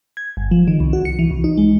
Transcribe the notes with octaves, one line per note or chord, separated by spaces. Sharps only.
G#6
G1
F3
D#3
C2
F#4
C#7
E3
C2
D#4
G#3